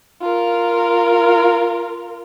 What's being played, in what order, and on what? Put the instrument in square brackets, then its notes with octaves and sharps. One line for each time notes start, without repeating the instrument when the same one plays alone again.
[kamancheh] F4 A#4